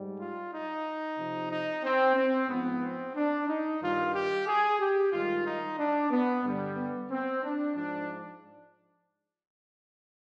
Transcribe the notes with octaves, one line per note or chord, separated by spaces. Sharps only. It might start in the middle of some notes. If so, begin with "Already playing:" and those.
Already playing: G#2 G3
F4
D#4
C3 F3
D#4
C4
C4
G#2 F3 B3
C4
D4
D#4
G2 D#3 G3 F4
G4
G#4
G4
G#2 D#3 G3 F4
D#4
D4
B3
G2 D3 G3
B3
C4
D4
G#2 F3 D4